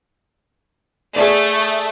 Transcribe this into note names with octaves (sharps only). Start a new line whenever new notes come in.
A3 G#4 D5